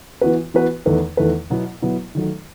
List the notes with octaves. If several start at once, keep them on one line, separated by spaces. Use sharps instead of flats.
E3 B3 F#4 B4
E3 B3 F#4 B4
E2 D#3 A3 E4 B4
E2 D#3 A3 E4 B4
B2 F#3 B3 E4
B2 F#3 B3 E4
D#3 F#3 A3